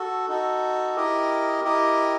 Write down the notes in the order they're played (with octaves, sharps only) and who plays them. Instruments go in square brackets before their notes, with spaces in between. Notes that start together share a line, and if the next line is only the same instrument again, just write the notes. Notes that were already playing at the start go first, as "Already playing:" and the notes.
Already playing: [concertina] F#4 A4
D#4 F#4 A4
E4 G4 A#4 D#5
E4 G4 A#4 D#5